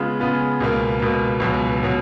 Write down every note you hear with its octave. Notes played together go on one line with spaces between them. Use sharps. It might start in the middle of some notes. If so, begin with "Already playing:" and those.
Already playing: C#3 G#3 B3 F4
C#3 G#3 B3 F4
C#2 B2 A#3
C#2 B2 A#3
C#2 B2 F#3
B2 F#3